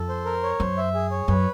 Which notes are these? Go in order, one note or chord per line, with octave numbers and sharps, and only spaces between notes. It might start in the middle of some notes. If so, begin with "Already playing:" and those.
Already playing: F2 A4
C5
A#4
C#5
F#2 C5
E5
G#4
C#5
F#2 B4